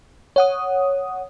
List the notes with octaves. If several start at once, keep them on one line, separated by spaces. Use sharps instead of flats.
C#5 F#5 D#6